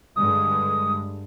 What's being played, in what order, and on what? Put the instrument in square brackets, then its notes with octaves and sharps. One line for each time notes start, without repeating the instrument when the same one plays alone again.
[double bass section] G2 D3 G#3 [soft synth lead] D#6